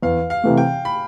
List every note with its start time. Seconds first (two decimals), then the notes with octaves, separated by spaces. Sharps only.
0.03 E2 F5
0.30 F5
0.44 C3 E3 A3
0.57 G5
0.85 B5